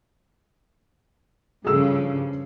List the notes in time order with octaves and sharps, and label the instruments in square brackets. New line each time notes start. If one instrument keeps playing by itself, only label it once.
[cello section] G2 C#3 F3 [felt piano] G#4 A4 E6